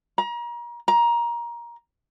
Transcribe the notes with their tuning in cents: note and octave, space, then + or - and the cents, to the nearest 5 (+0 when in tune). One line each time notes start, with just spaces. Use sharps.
A#5 +35
A#5 +20